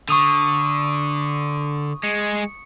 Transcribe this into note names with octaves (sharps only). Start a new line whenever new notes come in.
D3 C#6 D#6 D#7
G#3 C#7